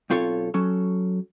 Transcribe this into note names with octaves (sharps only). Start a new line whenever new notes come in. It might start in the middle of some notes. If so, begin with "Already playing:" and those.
B1 C4 F4 A4 C#5
F#3 C#4 A4